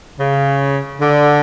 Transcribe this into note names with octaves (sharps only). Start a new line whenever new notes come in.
C#3
D3